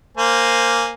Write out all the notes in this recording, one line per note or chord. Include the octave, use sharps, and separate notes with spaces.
A#3 C5 G#5